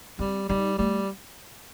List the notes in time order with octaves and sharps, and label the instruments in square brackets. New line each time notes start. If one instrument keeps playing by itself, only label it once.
[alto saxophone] G3 [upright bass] C4
[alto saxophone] G3 [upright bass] D#4
[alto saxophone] G3 [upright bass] A3